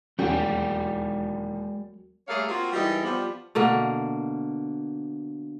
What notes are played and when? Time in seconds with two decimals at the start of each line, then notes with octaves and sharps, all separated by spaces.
0.19 E1 D#2 F#3 G#3 C#4 D5 G5
2.28 G3 A3 A#3 G#4 C#5 F5
2.48 A#3 C4 F4 F#4
2.72 E3 G3 G#3 D#4 A#4
3.03 F3 G3 B3
3.55 B2 D3 A#3